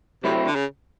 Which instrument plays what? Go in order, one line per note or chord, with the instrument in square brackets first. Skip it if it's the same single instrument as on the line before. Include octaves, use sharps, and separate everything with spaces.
[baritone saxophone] C3 [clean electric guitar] F#3 A3 C4 E4
[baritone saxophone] D3
C#3